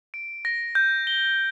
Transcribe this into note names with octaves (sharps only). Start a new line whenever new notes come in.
D7
A#6
G6
G7